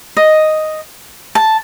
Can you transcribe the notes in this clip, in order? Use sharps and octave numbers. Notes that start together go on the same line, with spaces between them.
D#5
A5